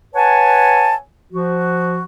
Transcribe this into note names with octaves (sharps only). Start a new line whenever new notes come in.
B4 C#5 F#5 G#5 A5
F3 F#4